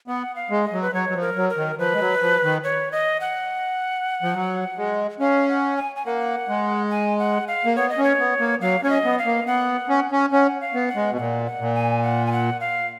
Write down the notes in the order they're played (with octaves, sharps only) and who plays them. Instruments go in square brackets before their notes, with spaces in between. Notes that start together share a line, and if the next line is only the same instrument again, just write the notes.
[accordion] B3 [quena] F#5
[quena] F5
[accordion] G#3
[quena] D#5
[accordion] F#3
[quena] B4
[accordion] F#3 [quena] C#5
[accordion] F#3
F3
[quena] A#4
[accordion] F#3
[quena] A#4
[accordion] D#3
[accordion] F3 [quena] B4
[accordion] G#3
F#3
F3
D#3
[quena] C#5
D#5
F#5
[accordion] F3
F#3
G#3
[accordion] C#4 [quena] F5
[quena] F#5
G#5
G#5
[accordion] A#3 [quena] F#5
[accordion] G#3
[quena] G#5
F#5
F5
[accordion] A#3
[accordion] B3 [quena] C#5
[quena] D#5
[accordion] C#4
[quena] C#5
[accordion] B3
A#3
[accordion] F#3 [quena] F5
[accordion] C#4 [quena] C#5
[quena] D#5
[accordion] B3
[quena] F5
[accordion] A#3
[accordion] B3 [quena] F#5
[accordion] C#4
C#4
[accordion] C#4 [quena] F#5
[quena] F5
[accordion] B3
[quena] F#5
[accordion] G#3
B2
[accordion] A#2 [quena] F#5
[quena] F#5
[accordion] A#2
[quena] G#5
F#5
G#5
F#5
F5